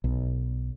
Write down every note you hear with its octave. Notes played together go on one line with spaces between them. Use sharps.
B1